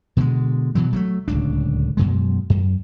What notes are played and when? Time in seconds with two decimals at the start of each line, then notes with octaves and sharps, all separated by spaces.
0.17 B2 D3 E3 G#3
0.75 B2 E3 F#3
0.93 F#3 G#3 A3
1.28 D1 C#2 D4
1.97 F#2 B2 G#3
2.50 F#2